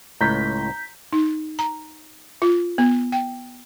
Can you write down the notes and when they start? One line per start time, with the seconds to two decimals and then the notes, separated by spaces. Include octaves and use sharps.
0.21 C#2 A2 A#5 G6 B6
1.13 D#4
1.59 A#5
2.42 F4
2.78 B3
3.12 G5